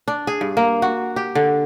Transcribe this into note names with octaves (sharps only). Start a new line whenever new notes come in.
D4
G#4
G2
A#3
F#4
G4
D3